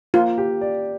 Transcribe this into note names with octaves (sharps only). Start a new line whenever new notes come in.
A#3 F4
G4
D5